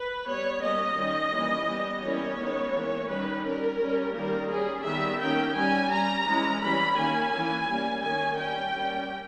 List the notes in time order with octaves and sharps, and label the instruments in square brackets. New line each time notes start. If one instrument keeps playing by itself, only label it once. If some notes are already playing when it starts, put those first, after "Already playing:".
Already playing: [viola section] B4
G3 B3 C#5
G3 A#3 C#4 D#5
D#3 G3 C#4
E3 G3 A#3 C#4
G3 B3
E3 G3 A#3 C#4 C#5
D#3 G#3 B3
E3 A#3 C#4
D#3 G3 C#4 B4
G3 C#4 A#4
G3 C#4
D#3 G3 A#3 A#4
G3 C#4 G#4
D#3 G3 B3 E5
D#3 A#3 C#4 G5
G3 C#4 G#5
G3 C#4 A#5
E3 G#3 C#4
E3 G3 C#4 B5
D#3 A#3 C#4 G#5
E3 A#3 C#4
G3 A#3 C#4
D#3 A#3 C#4 G#5
G3 C#4 G5
G3 A#3 C#4